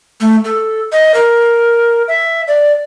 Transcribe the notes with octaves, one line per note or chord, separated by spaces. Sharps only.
A3
A4
D#5
A#4
E5
D5